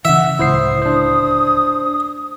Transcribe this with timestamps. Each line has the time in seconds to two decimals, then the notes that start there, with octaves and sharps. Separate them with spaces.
0.05 C#3 E3 E5 F#5
0.39 D1 C#2 E4 C5 D#6 C7
0.82 D4 C5